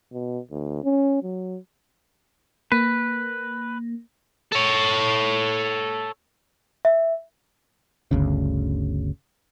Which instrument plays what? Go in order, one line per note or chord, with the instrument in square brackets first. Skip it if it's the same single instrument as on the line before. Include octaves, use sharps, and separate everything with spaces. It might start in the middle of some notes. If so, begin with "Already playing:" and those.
[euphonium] B2
D2
C#4
F#3
[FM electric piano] A#3 [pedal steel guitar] B4
[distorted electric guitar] A4 C#5
[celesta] E5
[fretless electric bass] G1 D2 C#3